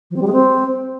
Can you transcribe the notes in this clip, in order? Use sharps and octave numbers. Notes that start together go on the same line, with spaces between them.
F3
C4
G3
G#3
C4